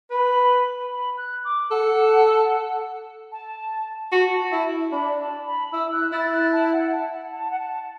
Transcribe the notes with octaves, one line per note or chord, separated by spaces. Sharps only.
B4 B5
B5
F#6
D6
A4 F#5
A5
F#4 A5
E4
D4 B5
A5
B5
E4 E6
F#6
E4 A6
F#6
A5
F#5
A5
F#5
A5
F#5
A5